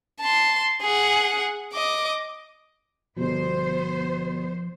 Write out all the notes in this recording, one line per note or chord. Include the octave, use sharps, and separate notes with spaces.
A5 C6
G#4 F#5
D#5 D6
G1 B2 F3 B3 C5